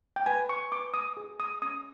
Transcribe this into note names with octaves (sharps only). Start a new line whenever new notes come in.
G5
B4 G#5
C#6
B4 D6
D#6
G#4
D#6
C#4 D#6